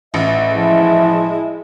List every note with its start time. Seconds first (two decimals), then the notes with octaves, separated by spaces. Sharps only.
0.14 A1 E5
0.55 F3 G#3 E4